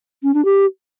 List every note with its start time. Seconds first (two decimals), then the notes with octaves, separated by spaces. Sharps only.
0.23 C#4
0.34 D4
0.45 G4